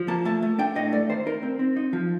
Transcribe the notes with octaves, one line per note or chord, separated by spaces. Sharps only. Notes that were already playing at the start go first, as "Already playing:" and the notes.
Already playing: F3
A#3 A5
A3 A5
A3
D4 G5
A2 D#5
A3 D5
D#3 C5
D#4 A#4
C4
C4
D#4
F3